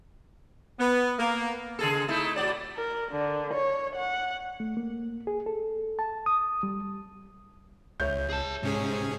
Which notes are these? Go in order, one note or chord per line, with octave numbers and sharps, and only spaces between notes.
B3
A#3
C#3 G#4 A4
A3 D#4 E4
A2 F#4 D5
A#4
D3
C#5
F#5
A3
A#3
G#4
A4
A5
D#6
G3
C#2 C#5 E5 G6
G#4 A5
G#2 C3 C#4 G#4